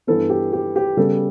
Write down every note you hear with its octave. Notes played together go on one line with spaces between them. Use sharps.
G2 E3 B3 A4
G4
G4
G4
C#3 G3 B3 A4